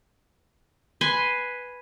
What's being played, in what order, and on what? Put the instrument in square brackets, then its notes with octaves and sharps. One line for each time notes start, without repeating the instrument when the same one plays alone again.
[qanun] B4 G#5 C6